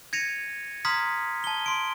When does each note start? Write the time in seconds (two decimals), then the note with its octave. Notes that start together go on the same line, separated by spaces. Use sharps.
0.13 G#6 A#6 C#7 D#7 F7
0.85 A#5 C6 D#6 F6 G#6 B6
1.44 A5 G7
1.66 C6 D7